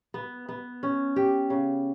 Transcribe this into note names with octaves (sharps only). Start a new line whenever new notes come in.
B3
B3
C#4
G4
C#3